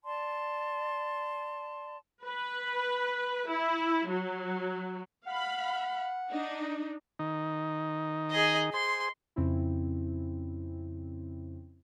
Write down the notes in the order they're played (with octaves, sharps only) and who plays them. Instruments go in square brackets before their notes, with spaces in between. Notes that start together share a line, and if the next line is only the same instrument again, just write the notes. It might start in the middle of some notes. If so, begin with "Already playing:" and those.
[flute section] D5 A5 C6
[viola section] B4
E4
F#3
[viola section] F5 B5 [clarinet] F#5
[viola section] D4 D#4
[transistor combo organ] D#3 D#4
[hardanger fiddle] G#4 D#5
[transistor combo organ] G#4 C5 [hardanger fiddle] C6
[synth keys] F2 C#3 C4 C#4 E4